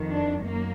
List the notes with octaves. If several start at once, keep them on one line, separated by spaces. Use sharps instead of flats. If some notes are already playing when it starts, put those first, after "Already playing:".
Already playing: F2 D#3
D4
F#2 A#3